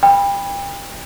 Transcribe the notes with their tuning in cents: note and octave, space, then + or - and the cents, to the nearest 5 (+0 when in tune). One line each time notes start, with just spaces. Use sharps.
G5 +30 B5 +0